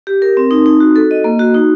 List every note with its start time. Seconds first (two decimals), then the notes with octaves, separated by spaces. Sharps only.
0.07 G4
0.22 A#4
0.37 C4
0.51 D#4
0.66 D#4
0.80 F#4
0.96 A4
1.11 D#5
1.24 A#3
1.39 F#4
1.55 D#4